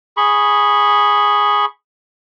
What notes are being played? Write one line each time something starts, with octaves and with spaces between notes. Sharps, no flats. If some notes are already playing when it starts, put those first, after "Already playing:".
G#4 B5 C#6